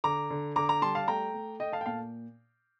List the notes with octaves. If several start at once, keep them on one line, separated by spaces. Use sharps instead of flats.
D3 A#5 D6
D3
D3 A#5 D6
A#5 D6
G3 A5 C6
F5 A5
A3 G5 A#5
A3
A3 D#5 G5
F5 A5
G5
A#2 F5 A5